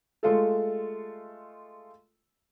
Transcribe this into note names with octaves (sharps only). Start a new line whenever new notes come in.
G#3 A3 F4 A4